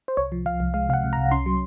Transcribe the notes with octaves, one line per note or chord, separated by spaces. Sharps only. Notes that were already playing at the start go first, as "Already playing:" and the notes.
C5
C2 C#5
F3
F3 F5
C2
G#3 F5
C3 F5 F#5
C3
A#5
C2
C#4 C6
F#3